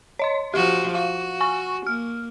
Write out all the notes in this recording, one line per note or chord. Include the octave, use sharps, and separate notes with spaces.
C#5 D#5 C6
F3 F#4 G4
F#4 F5
G#5 C#6
A#3 F6